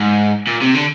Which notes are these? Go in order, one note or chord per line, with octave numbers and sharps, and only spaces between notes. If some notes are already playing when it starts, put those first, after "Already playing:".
Already playing: G#2
A#2
C3
D3